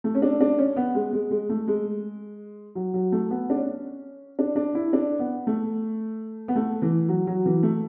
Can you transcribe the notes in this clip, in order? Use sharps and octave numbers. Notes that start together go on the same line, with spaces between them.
A3
C#4
D4
D4
C#4
B3
G#3
G#3
G#3
A3
G#3
F#3
F#3
A3
B3
D4
C#4
D4
D4
E4
D4
B3
A3
B3
A3
E3
F#3
F#3
E3
A3